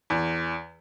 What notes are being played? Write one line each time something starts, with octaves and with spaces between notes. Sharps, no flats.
E2